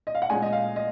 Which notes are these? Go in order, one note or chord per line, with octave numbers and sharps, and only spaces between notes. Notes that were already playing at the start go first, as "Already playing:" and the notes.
D#5
F5
F#5
A#2 G#3 C#4 G#5
D#5
F5
D#5